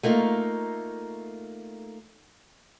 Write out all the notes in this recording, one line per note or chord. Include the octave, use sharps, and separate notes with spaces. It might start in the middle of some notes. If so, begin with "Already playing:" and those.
A3 A#3 D#4 F4